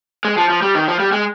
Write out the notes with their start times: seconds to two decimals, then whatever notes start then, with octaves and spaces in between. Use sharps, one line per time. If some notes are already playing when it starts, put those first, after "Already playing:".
0.25 G#3
0.38 F3
0.50 F3
0.62 G3
0.75 D#3
0.88 F3
1.00 G3
1.12 G#3